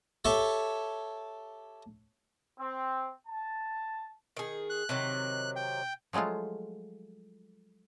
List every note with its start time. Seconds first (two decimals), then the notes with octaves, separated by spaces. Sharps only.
0.25 G4 A4 C#5 E5 A5
2.59 C4
3.27 A5
4.37 D#3 G#4
4.70 F#6
4.89 C3 D#3 F#3
5.56 G5
6.13 F3 F#3 G#3 A3 F4